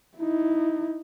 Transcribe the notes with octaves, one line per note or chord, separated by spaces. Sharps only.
D#4 E4